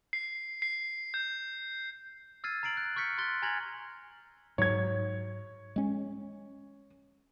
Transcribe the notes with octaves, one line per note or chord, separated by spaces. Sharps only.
C7
C7
G6
E6 F6 G#6 A6 C7 D#7
A#5 A6 C7 D7 F#7
F#6
C#6 F6 G6 B6 C#7
C6 F#6 A6 G7
G#5 A#5 F6 G#6 A#6 F#7
G#2 F#3 C#5 G#6
G#3 C#4